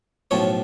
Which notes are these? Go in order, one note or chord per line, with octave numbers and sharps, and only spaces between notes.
B1 A2 F3 C#5